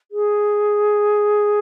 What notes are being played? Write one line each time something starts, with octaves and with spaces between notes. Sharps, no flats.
G#4